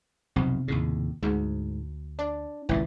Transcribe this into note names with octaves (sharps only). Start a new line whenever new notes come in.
B1 F2 C3
D#2 A2 C#3
D2 G#2
D4
G#1 C#2 A#2 E3